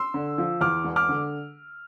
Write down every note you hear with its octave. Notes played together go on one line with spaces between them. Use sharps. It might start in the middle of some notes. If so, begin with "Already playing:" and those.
Already playing: C6 E6
D3
F3
E2 D6 F6
E1
D6 F6
D3